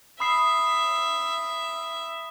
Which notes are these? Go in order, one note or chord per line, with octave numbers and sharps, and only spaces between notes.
E5 B5 D#6 C7